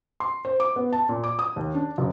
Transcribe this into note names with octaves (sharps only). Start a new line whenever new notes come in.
C6
C5
D6
B3
A5
A#2
D6
D#6
D#2
D4
F#1